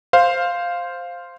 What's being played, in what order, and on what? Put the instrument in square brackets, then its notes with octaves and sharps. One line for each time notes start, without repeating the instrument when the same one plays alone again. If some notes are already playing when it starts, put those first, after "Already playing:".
[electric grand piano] C5 F5